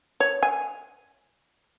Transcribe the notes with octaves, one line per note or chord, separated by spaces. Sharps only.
C#5
G#5